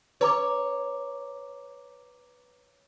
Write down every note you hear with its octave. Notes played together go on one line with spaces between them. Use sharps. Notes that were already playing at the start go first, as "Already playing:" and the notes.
B4 C#5 A#5 D6